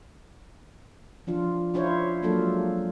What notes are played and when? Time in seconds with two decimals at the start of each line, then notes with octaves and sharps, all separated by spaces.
1.27 F3 D4 F4
1.74 D4 E4 F4 C5 C#5
2.22 F#3 G#3 A#3 D4 F4 A4